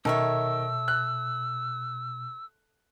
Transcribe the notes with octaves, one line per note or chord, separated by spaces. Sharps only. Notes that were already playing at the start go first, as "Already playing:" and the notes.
B2 D#3 A4 C#5 E5 E6
F#6